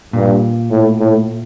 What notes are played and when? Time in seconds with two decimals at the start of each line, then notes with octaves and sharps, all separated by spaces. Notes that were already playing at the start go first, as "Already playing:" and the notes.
0.13 G2 A#2
0.71 A2
0.99 A2